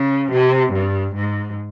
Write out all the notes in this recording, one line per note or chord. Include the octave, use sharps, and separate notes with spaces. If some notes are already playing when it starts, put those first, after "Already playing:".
Already playing: C#3
C3
G2
G#2